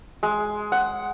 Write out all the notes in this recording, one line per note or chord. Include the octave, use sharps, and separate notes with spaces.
G#3
F#5